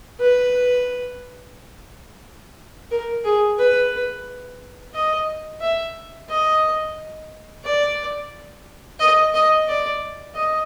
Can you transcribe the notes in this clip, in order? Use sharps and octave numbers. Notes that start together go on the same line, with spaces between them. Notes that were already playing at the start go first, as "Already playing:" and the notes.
B4
A#4
G#4
B4
D#5
E5
D#5
D5
D#5
D#5
D5
D#5